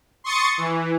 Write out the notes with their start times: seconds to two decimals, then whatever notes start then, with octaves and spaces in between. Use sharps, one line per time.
0.24 C6 C#6 D#6 A6 C#7
0.58 E3